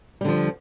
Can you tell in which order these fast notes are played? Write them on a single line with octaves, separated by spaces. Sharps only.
G3 D3 F3